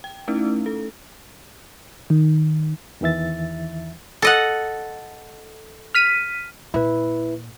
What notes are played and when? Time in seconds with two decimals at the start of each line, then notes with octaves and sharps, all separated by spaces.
0.04 G5
0.28 A3 C#4 D#4 E4
0.66 A4
2.10 D#3
3.01 E2 D#3 E3 E5 A6
4.22 A4 D#5 F#5
5.95 F6 B6 D#7
6.74 A#2 E4 B4